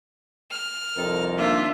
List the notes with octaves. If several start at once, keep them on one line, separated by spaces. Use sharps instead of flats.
F6
C2 F2 C4 D#4 A4 A#4
D#3 A#3 D4 F4 E5